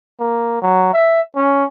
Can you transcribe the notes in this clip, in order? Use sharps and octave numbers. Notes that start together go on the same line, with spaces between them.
A#3
F#3
E5
C#4